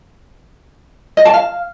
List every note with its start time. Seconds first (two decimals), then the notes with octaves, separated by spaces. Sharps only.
1.17 D#5
1.25 A5
1.34 F5